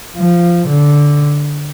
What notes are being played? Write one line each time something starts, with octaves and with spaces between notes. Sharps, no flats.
F3
D3